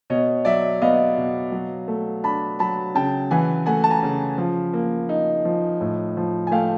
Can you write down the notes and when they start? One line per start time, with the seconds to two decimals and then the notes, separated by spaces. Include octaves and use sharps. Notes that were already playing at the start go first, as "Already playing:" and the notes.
0.10 B2 C#5 D#5
0.45 F#3 D5 E5
0.82 B3 D#5 F5
1.17 B2
1.52 F#3
1.88 A3
2.23 D4 A5 B5
2.59 F#3 A5 B5
2.95 C#3 G5 A5
3.31 E3 F#5 G#5
3.66 A3 F#5 G#5
3.84 A5
3.90 G#5 A#5
4.03 C#3
4.38 F3
4.73 A#3
5.09 D#4
5.45 F3
5.81 A2
6.17 F3
6.47 G#5
6.51 A3 F5 G5